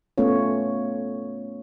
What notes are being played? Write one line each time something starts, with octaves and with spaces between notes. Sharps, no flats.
A3 B3 C#4 F4 C#5